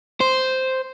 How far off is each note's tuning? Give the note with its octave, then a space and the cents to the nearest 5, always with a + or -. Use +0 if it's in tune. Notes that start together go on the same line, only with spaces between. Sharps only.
C5 -5